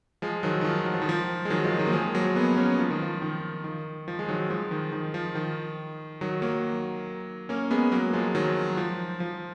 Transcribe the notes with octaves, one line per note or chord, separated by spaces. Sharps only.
F3 G#3
D#3 F#3
D#3
F3
F#3
F3
D#3
F3
G#3
D#3 F#3
F3 G#3
D#3 F#3
A#3
F3 G#3
F#3 A#3
G#3 B3
A#3 C#4
F3
D#3
F3
D#3
D#3
F3
G#3
D#3 F#3
F3 G#3
D#3
D#3
F3
D#3
D#3 F#3
F#3 A#3
A#3 C#4
G#3 B3
F#3 A#3
F3 G#3
D#3 F#3
F3
F3